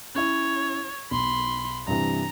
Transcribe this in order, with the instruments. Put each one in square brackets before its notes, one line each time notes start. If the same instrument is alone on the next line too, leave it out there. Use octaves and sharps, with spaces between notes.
[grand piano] C#4 E4 [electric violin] C#5
[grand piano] B1 [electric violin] B5 C6
[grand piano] G2 C3 E3 [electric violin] A#5